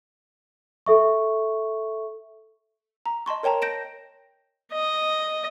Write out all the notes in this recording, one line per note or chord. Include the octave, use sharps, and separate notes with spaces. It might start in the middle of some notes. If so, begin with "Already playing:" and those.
A4 E5 C#6
A#5
D#5 A5 C6 C#6
A#4 C#5 G5 A5 A#5
G6 A#6 D7 E7
D#5